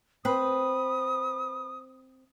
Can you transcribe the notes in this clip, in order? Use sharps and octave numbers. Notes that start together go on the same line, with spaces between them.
C4 B4 D#6